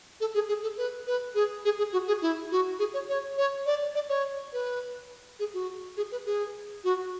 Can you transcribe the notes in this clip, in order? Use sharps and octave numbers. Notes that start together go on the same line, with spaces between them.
A4
G#4
G#4
A4
B4
B4
G#4
G#4
G#4
F#4
G#4
E4
F#4
G#4
C#5
C#5
C#5
D5
D5
C#5
B4
G#4
F#4
G#4
B4
G#4
F#4